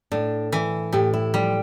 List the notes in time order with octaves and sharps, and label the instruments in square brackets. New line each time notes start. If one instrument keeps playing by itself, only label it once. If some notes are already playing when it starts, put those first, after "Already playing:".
[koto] A2 [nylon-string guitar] D4
[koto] E3
[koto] A2 [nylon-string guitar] G4
[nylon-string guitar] E4
[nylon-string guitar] F3 [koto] G3